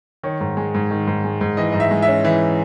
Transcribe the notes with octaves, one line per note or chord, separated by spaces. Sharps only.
D#3 C#5
G#2
G#3
G#2
D#3
G#2
G#3
G#2
E3 D#5
G#2 D#5
E5
G#3
E5
C#4
E3 E5